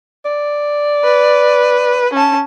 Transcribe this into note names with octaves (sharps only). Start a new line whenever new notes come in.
D5
B4
C#4 A5